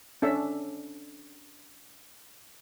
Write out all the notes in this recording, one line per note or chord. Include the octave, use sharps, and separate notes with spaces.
C#4 D4 A4 E5